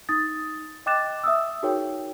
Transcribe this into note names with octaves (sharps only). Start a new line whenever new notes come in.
D#4 D#6 A6
D#5 G5 D6 F#6 A6 E7
E5 D#6 E6
D#4 F#4 G#4 A#4 C#5 G5